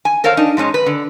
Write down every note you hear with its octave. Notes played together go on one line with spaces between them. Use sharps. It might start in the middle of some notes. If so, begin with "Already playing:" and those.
G#5
A4 A#4 C5 C#5 F5
D4 D#4
G#2 G#3 C#4 D#4
B4
D3